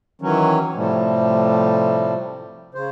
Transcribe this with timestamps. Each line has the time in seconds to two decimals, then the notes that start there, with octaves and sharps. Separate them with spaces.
0.22 D#3 E3 F#3 C#4
0.75 A2 C3 F3 G3 A3
2.74 C#3 C5